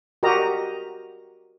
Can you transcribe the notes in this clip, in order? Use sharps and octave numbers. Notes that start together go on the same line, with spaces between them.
F#4 G4 A#4 D#5 A#5